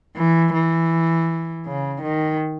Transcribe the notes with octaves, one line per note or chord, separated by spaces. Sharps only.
E3
E3
C#3
D#3